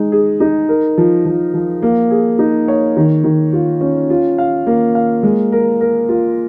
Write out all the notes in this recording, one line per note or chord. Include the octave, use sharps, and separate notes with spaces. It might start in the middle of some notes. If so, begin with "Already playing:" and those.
Already playing: G#3 D#4
G#4
D#4
A#4
F3
F3
F3
A#3
G#4
D#4
C#5
D#3
D#3
F4
C#4
F4
F5
A#3
F5
G#3
A#4
A#4
F4